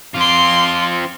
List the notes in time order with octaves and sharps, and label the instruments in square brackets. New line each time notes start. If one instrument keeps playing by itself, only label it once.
[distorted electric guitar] C4 F4 [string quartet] C6 D6